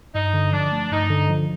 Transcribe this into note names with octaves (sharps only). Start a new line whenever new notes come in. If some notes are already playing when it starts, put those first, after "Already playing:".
G2 D#4
D3
F3 D4
A3
G2 D#4
D3
F3